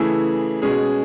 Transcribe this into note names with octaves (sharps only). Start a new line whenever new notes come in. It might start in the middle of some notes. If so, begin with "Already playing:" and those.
Already playing: C#3 E3 A3 E4 G#4
B2 G#3 C#4 G#4